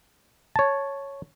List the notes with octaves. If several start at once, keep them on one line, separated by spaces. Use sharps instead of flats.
C#5 A5